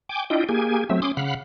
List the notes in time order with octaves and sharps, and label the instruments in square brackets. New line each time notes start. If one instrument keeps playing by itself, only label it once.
[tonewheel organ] G5 G#5 D6
D4 E4 F4 D#5 G5
A#3 G4 G#4 G#5
F#3 A3 C4 E5
C#4 C6 D6 D#6
C#3 F5 F#5 B5